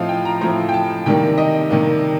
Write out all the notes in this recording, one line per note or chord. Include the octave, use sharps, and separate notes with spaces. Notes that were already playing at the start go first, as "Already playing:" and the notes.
Already playing: A2 F3 C4 D#5 F5
G5
A#5
A2 F3 C4 A#5
G5
A5
C3 D#3 G3 A#3 G5
D#5
C3 D#3 G3 A#3